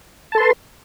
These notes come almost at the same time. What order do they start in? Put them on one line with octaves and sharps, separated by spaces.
A5 A4 C6 B4